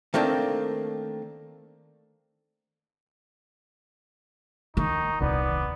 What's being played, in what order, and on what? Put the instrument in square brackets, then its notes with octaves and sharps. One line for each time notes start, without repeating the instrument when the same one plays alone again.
[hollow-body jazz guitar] D#3 A3 A#3 C4 D4
[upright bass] D#3 [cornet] D#4 [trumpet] C#6
[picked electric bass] D#1 C2 [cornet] B3 [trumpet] D5